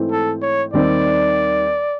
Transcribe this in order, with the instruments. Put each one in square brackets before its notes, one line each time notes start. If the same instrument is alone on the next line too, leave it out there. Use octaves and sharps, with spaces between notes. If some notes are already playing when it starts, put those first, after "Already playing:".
Already playing: [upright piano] G#2 E3 A3 C4 E4
[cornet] A4
C#5
[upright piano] D#2 D#3 G3 C4 [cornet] D5